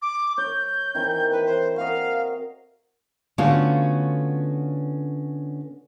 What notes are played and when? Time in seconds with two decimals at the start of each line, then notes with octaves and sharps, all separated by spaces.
0.02 D6
0.38 C#5 G6
0.95 D#3 E3 C4
1.31 E4 B4
1.45 C5
1.76 F#4 A#4 D#5 F5
3.38 D3 A3 B3 C#4 F4 F#4